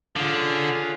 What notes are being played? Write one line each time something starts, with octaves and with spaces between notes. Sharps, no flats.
D3 C#4 F4 G#4